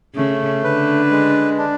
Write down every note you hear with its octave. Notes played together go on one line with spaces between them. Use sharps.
C#3 A3
D3 B4
G#3
D4